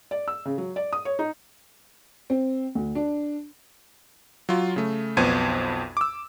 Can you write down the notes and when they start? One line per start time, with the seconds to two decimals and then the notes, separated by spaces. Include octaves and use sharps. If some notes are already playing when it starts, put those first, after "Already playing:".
0.11 D5
0.28 E6
0.45 C#3
0.58 F#3
0.76 D5
0.93 D#6
1.05 C#5
1.19 D#4
2.30 C4
2.75 D2
2.95 D4
4.49 F#3 F4
4.76 C#3 A3
5.17 B1 F2 B3 C5 G#6 D#7
5.97 D6 E6